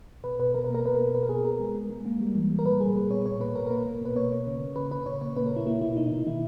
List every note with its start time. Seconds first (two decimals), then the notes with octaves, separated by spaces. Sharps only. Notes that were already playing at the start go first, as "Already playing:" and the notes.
0.24 B2 B4
0.40 B2 B4
0.54 B2 A#4
0.64 B4
0.70 A#3 A#4
0.85 B2 B4
0.95 B3 A#4
1.14 B2 B4
1.23 A#4
1.29 B2 G#4
1.45 B3 A#4
1.60 G#3
1.75 G#3
1.90 G#3
2.05 A#3
2.20 G3
2.35 E3
2.50 G3
2.59 A#4
2.65 A#2 B4
2.80 A#2 G#4
2.95 A#2 B4
3.10 B3 C#5
3.26 A#2 C#5
3.40 A#3 B4
3.55 A#2 A#4
3.66 A#4
3.70 A#3 B4
3.86 A#3
4.01 B2 B4
4.16 A#3 C#5
4.31 A#3
4.47 C#3
4.61 C#3
4.76 C#3 B4
4.91 C#3 B4
5.06 A#2 C#5
5.21 A#3 C#5
5.36 A#3 B4
5.46 A#4
5.51 A#2
5.56 E4
5.66 A#3 E4
5.81 B2 E4
5.97 B2 D#4
6.07 D#4
6.12 B2
6.27 D#3 E4